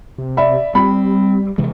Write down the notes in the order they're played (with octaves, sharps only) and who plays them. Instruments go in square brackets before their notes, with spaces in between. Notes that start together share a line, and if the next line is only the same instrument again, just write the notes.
[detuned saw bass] C3
[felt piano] D5 E5 B5
[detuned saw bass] G3 [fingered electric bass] C4 [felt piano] B5
[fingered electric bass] C3 E3 G#3